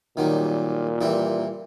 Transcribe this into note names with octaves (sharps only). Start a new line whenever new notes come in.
A#2 D#3 F#3 G3
E3 G3 E4